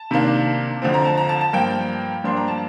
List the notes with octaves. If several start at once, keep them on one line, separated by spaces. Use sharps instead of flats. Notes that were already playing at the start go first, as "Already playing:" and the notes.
Already playing: A5
C3 D#3 A#3 D4
F2 D3 F3 C4
A#5
A5
A#5
A5
A5
G2 F3 A#3 G5
G2 F3 A#3 D4 C6
A#5
A5